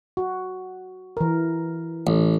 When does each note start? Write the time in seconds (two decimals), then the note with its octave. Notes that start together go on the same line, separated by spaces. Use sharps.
0.17 F#4
1.17 E3 A#4
2.07 A1